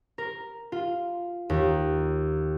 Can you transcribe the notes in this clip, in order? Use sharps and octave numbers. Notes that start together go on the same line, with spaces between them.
A#4
F4
D#2